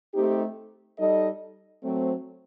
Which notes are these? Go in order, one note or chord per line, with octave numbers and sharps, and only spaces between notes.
A3 C4 D#4 G4
G3 D#4 A4 D#5
F#3 A3 C4